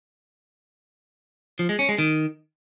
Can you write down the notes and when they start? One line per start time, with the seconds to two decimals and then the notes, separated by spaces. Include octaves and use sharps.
1.59 F3
1.69 G#3
1.79 C#4
1.89 G#3
1.99 D#3